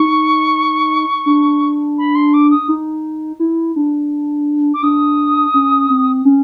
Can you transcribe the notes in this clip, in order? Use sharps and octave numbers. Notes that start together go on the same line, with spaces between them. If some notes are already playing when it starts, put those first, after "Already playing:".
Already playing: D#4 C#6
D4
B5
C6
D6
D#6
D#4
E4
D4
D6
D4 D#6
C#4
C4
C#4